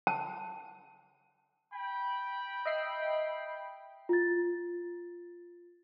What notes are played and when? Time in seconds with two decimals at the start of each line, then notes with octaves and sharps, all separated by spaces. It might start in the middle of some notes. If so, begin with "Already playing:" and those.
0.07 A5
1.74 G5 B5
2.65 D#5 E5 C7
4.09 F4 A6